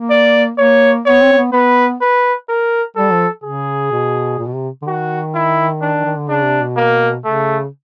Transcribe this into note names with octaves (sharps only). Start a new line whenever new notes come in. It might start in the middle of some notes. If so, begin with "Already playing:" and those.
Already playing: A#3
D5
A#3 C#5
B3 C#5
C4
C4
B3
B3 B4
B4
A#4
G3 A4
F3
C#3 G#4
B2
A#2
B2
C3
D3
D#3 F#4
E4
D4
D#3
D3
C#3 D4
C3
B2
A#3
C#3 A3